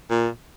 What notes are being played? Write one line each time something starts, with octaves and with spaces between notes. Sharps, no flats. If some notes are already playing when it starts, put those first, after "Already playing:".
A#2